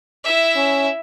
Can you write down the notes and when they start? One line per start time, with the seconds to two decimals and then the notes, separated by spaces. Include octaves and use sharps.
0.24 E4 E5
0.56 C#4